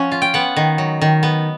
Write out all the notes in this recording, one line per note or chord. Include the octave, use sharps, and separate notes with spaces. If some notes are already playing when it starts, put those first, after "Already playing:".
Already playing: F3 C#4 F#5
F4
G5
B3 F#5
D#3
F#3
D#3
B3